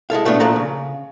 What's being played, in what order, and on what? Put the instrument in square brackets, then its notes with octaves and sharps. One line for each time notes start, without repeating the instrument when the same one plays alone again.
[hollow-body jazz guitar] G#3 E4 A4 F5
A2 A3 B3 C#4 D4
A#2 F3 A4 F#5 A#5
C#3